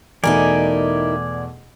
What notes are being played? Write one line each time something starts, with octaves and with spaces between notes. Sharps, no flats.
E2 B2 A3 D#4 E4 A#4 D5 G#5